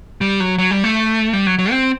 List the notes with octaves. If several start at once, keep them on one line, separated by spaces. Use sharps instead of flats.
G3
F#3
F#3
G3
A3
G3
F#3
F#3
C4